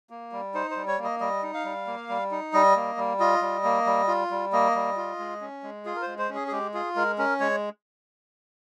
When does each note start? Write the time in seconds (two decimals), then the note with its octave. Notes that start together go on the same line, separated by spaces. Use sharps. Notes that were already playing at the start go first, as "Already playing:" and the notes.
0.10 A#3
0.32 G3
0.54 D#4 C5
0.71 C5
0.76 G3
0.88 C#5
0.98 A#3
1.04 D#5
1.20 G3 D#5
1.43 D#4
1.54 F5
1.65 G3
1.87 A#3
2.09 G3
2.31 D#4
2.53 G3 D#5
2.76 A#3
2.97 G3
3.20 F4 D#5
3.42 G3
3.64 A#3
3.86 G3
4.08 F4
4.30 G3
4.53 A#3 D#5
4.75 G3
4.97 F4
5.19 G#3
5.41 C#4
5.63 G#3
5.85 F4 G#4
5.96 A#4
6.02 C5
6.07 G#3
6.18 C5
6.29 C#4
6.35 G#4
6.48 G#4
6.52 G#3 G4
6.74 F4 G#4
6.96 G#3 A#4
7.18 C#4 A#4
7.40 G#3 C#5